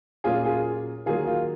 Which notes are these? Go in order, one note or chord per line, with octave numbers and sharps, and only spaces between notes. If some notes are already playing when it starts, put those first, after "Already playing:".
A#2 F#3 A#3 C#4 F4 G#4
F4 G#4
D#3 F#3 A#3 F4 G#4
F4